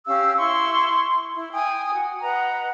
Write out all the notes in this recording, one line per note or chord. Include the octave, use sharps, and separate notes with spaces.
C#4 G4 F5 E6
E4 C6 C#6
E4
G5 G#5 D#6
F#4
B4 D#5 F#5 A#5